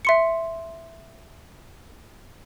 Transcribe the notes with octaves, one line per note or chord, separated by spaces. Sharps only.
E5 C6 C#7